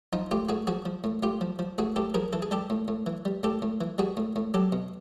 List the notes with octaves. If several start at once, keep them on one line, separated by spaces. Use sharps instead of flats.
F3 D#4 F4
A2 F4 G4
A2 F#4 G#4
F3 F#4 G#4
F3
A2
A2 F4 G4
F3
F3
A2 F#4 G#4
A2 G4 A4
F3 G#4 A#4
E3 A4
G#4
G3 G4 A4
A2
A2
E3
G3
A2 G4 A4
A2
E3
G3 F#4 G#4
A2
A2
F#3 G4 A4
B2